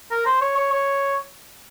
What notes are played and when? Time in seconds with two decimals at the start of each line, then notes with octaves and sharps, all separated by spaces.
0.11 A#4
0.26 C5
0.41 C#5
0.57 C#5
0.72 C#5